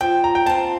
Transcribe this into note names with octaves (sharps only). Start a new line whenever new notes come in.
F3 G5
A#5
G5
C4 F4 A5